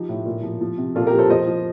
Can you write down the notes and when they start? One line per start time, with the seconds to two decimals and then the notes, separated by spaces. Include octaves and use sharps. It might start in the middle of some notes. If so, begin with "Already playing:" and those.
Already playing: F3 D#4 G4
0.09 A2
0.26 A#2
0.43 F3
0.61 F3
0.78 C3
0.95 A#2 F4 A4
1.07 G4 A#4
1.13 F3
1.18 A4 C5
1.30 F3 C5 D#5
1.48 F3